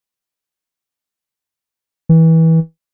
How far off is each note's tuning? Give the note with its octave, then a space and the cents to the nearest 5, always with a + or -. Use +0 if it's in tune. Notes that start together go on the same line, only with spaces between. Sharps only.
E3 -25